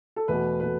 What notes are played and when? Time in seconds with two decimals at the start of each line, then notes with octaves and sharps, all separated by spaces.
0.16 A4
0.28 E2 B2 A3 B4
0.60 B2 A3 B4